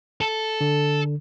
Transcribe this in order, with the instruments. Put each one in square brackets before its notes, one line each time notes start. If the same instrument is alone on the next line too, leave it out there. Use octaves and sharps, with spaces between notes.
[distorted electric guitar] A4
[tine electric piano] D3